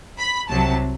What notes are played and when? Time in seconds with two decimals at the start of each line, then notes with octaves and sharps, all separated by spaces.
0.18 B5
0.49 C2 C3 F#3 A5